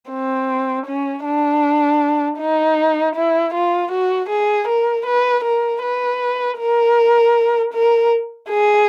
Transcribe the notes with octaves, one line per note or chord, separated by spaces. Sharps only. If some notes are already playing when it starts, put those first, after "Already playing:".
C4
C#4
D4
D#4
E4
F4
F#4
G#4
A#4
B4
A#4
B4
A#4
A#4
G#4